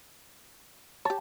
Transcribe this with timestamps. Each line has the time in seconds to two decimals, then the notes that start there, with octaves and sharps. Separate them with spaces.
1.05 G4 C#5 A5